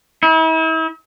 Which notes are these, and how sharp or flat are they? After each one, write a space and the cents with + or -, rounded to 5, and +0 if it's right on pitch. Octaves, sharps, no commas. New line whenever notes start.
E4 -40